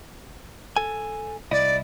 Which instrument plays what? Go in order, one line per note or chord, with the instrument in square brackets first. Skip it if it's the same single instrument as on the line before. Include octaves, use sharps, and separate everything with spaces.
[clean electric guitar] A4 G#5
[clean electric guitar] C2 E4 D#5 [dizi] D5